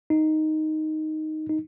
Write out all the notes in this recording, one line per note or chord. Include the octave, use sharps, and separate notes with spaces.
D#4
D#4